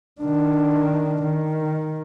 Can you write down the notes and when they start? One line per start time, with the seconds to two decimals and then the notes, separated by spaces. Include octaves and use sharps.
0.21 D#3 D4
1.22 D#3